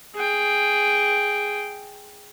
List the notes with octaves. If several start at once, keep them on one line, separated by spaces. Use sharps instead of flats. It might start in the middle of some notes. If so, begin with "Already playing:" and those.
G#4 G5